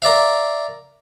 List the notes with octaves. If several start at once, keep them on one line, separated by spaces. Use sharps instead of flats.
A#4 D5 E5 F5